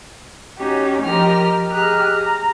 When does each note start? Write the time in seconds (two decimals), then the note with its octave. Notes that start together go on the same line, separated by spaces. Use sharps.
0.57 C#4 D#4 F#4 G4
1.03 F3 G4 A#4 D#5 F6
1.70 G4 G#4 D#5 A#5 F6 F#6
2.12 A#5